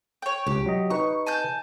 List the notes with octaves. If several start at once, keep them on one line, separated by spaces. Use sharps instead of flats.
C#5 G5
C#2 G4
F#3 D#5
D#4 B4 C#6
G#5 A5 G6